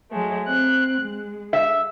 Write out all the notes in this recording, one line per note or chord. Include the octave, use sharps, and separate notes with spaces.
F#3 G#3 A3
C4 F#6
G#3
E5